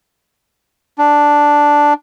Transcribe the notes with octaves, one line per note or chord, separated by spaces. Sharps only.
D4